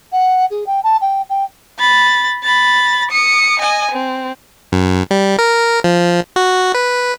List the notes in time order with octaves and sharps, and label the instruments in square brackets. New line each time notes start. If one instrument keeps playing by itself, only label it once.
[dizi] F#5
G#4
G5
A5
G5
G5
[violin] B5 A6
B5 A6
D#6 C#7
D#5 G#5
C4
[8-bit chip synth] F#2
G3
A#4
F3
F#4
B4